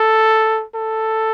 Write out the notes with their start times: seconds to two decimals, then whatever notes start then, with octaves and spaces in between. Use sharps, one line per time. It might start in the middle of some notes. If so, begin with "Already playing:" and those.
Already playing: A4
0.75 A4